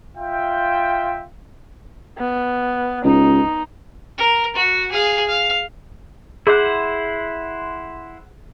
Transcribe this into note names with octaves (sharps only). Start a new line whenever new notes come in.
F4 E5 G5
B3
C#2 D#4
A#4
F#4
G#4 F5
F5
E4 G#4 C5 F#5